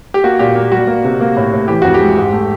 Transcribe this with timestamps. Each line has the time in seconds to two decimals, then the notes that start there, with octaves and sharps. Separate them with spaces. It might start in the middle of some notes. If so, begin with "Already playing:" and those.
0.14 G4
0.24 A#3 F#4
0.39 A#2 G4
0.55 A#3
0.72 G3 F#4
0.87 A#3
1.05 C3
1.21 A#3
1.36 A2
1.52 A2
1.68 E3 G4
1.82 F2 F#4
1.94 G4
2.00 G#3
2.17 G#2
2.32 A3